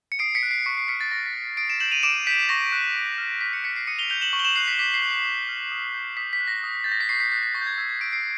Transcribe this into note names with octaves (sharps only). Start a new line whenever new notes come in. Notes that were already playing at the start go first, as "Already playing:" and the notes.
C#7
D#6 C7 D7
B6 C#7
F#6
C7
C#6 B6
C7
F6 B6 C#7
A6
C#6 A#6
B6
F#6
D#6 C7 D7
D7 E7
G6 E7 F#7
D#7 F7
D6 D7 E7
G6 B6
C#6 A#6
F#6
C#6
F6
D6 B6
B6 C#7
G6 B6 C#7
C7 D7
D#6 C#7 D#7
F7 G7
G6 F7 G7
E7 F#7
C#6
G7
E7 F#7
F#6 C7
B6
D6 B6
C7
F#6
C7
D6
F6
D#6
G6
D#6 B6
B6
F#6
A#6
D#6
G6 A6
A#6
B6
C#6 C7
B6
F#6 B6
B6
C#6 A#6
G6
G#6
E6 G6 G#6
G#6
C#6 C7 D7
C7 D7